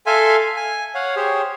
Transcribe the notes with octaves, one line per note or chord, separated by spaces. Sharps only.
A4 E5 F5 G#5 C6
G#5
C#5 F5 F#5
G4 G#4 C5 C#5